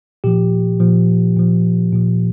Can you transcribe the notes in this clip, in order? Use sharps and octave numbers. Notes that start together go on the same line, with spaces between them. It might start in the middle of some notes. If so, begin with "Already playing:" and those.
A#2 F3 G4
A#2 F3
A#2 F3
A#2 F3